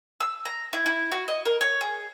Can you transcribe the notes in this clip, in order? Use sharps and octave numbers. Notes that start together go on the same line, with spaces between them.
E6
A#5
E4
E4
F#4
D#5
A#4
C#5
G#4